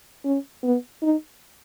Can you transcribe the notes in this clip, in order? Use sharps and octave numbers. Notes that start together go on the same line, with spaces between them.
C#4
B3
D#4